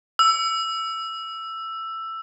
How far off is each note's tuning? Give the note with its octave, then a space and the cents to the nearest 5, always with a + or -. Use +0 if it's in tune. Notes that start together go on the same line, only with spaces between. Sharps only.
E6 +10